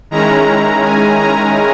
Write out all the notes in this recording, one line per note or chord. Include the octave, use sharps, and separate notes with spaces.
D#3 G#3 C#4 E4 A#5
G#5
A#5